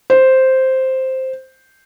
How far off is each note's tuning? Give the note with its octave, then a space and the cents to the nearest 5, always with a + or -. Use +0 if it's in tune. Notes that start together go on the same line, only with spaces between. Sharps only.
C5 +0